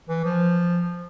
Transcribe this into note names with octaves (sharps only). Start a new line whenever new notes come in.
E3
F3